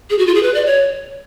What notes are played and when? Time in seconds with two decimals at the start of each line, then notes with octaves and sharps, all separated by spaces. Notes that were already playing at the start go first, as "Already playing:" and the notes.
0.10 G#4
0.19 F#4
0.27 F4
0.35 G#4
0.43 B4
0.54 D5
0.66 C#5